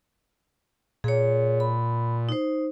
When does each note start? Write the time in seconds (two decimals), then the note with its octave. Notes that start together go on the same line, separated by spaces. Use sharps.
1.04 A#2 G#4 C#5
1.60 B5
2.29 D#4 C5